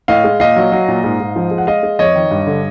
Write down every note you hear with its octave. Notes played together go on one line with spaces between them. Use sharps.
A2 D#5 F5
G#3
A#2 D#5 F5
F#3
F#3
A#2
G#2
G#2
F3
G#3
F#5
G#3 D#5 F5
G#3
F2 C#5 D#5
D#3
G2
D3